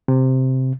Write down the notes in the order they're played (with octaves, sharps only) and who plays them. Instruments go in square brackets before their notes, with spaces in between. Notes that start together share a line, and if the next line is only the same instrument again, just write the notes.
[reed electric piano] C3